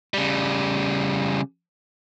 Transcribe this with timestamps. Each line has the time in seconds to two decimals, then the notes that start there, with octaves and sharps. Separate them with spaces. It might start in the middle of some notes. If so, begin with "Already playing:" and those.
0.14 C#3 G3